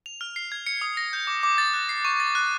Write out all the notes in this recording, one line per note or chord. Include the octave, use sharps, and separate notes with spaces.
F7
F6
C7
G#6
C#7
D#6
A#6
G6
D6
D6
A6
F#6
C7
C#6
A6
F#6